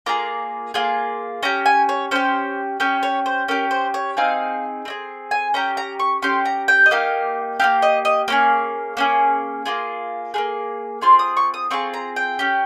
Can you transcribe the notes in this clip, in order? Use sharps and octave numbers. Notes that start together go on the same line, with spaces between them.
A#3 F4 G#4 A#5
A#3 F4 G#4
C#4 G4 A#5
G#5
C#5
C#4 G4 C5
C#4 G4 C#5
C#5
C5
C#4 G4 A#4
C5
C#5
C4 D#4 G#4 F5
C4 D#4 G#4
G#5
C#4 G4 A#5
A#5
C#6
C#4 G4 C6
A#5
G5
D#5
A#3 D#4 G4 F5
A#3 D#4 G4 F5
D#5
D#5
A#3 C#4 G#4 F5
A#3 C#4 G#4
A#3 F4 G#4
A#3 F4 G#4
C4 F4 G#4 C6
D#6
C#6
D#6
C4 F4 G#4 C#6
A#5
G5
C#4 G4